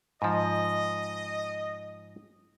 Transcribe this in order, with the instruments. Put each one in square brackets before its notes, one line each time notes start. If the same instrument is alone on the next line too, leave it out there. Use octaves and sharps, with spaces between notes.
[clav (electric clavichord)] G#2 F3 [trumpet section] D#5